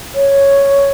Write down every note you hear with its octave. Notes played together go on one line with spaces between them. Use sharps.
C#5